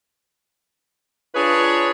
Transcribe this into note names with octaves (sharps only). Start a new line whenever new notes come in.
D4 F4 G#4 B4 C#5